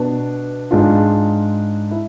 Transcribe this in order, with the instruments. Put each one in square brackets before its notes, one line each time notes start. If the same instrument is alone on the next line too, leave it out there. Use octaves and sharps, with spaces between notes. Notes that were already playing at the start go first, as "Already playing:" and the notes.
Already playing: [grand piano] B2 B3 D4
G#2 G#3 D4 F4
E4